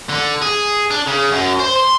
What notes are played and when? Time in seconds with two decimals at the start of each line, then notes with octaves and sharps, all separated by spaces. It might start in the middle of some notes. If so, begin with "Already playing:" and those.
0.09 D3
0.42 G#4
0.91 D4
1.07 C#3
1.32 F#2
1.59 C5
1.76 C6